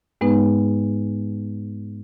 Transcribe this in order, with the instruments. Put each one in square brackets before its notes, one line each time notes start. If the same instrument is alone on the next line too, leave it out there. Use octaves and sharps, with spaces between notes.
[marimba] G#2 G#3 B3 D#4 B4